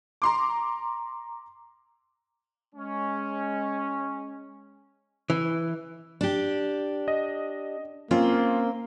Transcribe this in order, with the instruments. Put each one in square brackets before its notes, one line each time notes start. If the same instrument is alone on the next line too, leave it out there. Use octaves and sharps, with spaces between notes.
[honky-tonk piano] A#5 C6 D6
[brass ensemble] G#3 C#4
[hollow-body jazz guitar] E3
[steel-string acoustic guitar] D4 G4
[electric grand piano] D#5
[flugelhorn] A#3 [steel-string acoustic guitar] C4 C5 [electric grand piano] C#4 F4